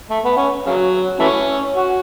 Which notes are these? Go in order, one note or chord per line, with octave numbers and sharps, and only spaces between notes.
A3
B3
C#4
C#3 F#3
E3 A3 C#4
F#4